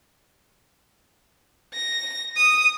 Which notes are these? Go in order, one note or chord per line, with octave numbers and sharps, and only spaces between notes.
A#6
D#6